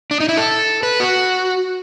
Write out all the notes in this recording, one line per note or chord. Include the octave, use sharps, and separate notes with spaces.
D4
D#4
E4
A4
B4
F#4